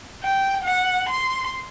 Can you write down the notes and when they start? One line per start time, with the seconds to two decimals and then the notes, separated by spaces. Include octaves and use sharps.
0.24 G5
0.65 F#5
1.10 C6